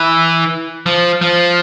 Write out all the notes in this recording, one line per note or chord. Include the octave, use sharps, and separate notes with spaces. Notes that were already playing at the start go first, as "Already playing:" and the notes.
Already playing: E3
F3
F3